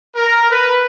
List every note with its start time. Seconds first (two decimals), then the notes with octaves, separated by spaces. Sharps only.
0.16 A#4
0.49 B4